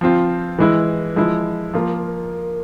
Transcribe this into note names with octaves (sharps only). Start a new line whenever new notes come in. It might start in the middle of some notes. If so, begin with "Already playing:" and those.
F3 C4 F4
E3 G#3 E4
F3 G#3 E4
F3 A#3 F4